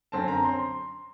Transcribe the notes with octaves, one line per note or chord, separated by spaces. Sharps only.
F#2 D3 F#3 C4 A5
A#5
C6